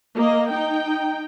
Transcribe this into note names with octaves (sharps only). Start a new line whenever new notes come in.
A#3 D#5
D#4 G5